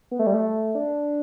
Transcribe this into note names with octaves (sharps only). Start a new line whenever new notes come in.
B3
A3
G3
A3
D4